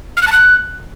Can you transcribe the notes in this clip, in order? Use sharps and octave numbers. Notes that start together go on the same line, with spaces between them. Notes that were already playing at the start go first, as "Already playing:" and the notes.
F6
F#6
A5
F#6